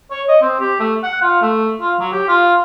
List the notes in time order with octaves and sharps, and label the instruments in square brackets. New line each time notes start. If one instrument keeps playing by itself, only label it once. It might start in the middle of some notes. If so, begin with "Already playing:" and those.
[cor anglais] C#5
D#5
C4
G4
A3
F#5
F4
A3
F4
F#3
G4
F4